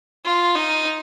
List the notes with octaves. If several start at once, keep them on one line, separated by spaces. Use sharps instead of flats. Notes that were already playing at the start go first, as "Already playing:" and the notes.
F4
D#4